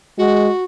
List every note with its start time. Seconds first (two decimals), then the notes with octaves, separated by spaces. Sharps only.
0.18 G#3 F#4